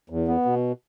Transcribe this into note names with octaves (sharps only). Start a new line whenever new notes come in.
E2
B3
B2